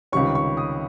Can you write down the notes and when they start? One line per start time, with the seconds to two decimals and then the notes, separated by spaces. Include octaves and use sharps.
0.12 C#2 C3 D#3 G3 C#4 C#6
0.35 C#6
0.57 D#6